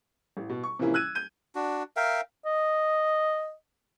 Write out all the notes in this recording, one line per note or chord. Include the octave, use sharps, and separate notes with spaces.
A1
B2
C#6
C3 E3 F3 A#3 C#4 E4
E6 F#6 G#6 D#7
G6 D#7
D4 F#4
A#4 E5 F5 G5
D#5